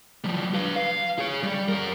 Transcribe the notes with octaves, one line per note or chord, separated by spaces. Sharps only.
F3 G3
B4 F5
F5
G#4 C#5
G3
F#2 A#4